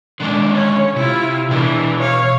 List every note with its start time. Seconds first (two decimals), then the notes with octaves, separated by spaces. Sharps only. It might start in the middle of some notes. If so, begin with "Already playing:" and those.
0.20 D3 D#3 G#3 D4
0.53 C#4 C#5
0.96 C3 E4 F4
1.51 B2 E3 D4 G#4
2.00 C#5 F5